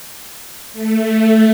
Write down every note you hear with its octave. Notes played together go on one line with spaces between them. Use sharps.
A3